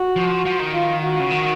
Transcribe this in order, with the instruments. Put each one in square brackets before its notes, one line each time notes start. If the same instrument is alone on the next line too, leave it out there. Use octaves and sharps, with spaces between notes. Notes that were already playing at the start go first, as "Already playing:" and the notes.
Already playing: [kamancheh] F#4
[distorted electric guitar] F3
F3
D#3
[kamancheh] F4
F#4
[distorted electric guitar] C#3
D#3